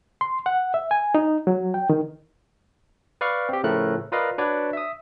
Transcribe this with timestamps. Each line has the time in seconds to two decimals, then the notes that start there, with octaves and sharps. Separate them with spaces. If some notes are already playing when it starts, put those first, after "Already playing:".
0.21 C6
0.46 F#5
0.74 E5
0.91 G#5
1.15 D#4
1.47 F#3
1.74 G5
1.90 D#3
3.21 B4 D5 F5 C#6 F6
3.49 C4 G4
3.63 A2 C#3 F3 A3 A#4 F#6
4.12 F4 A#4 B4 D5 D#5 F5
4.38 D4 F#4 B4 C#5 D5
4.73 E5 D#6